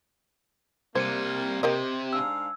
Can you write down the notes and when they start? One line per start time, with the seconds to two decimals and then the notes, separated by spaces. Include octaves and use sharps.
0.95 C3 G3 A#3 C5 G#6 C#7 D#7
1.63 C3 G4 A#4 D#5
2.13 G#2 D4 F5 E6